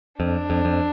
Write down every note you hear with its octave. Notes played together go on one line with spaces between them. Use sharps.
F2 D4
F2
F2